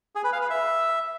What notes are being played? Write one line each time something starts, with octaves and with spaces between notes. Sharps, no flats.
G#4
B4
F5
B4
E5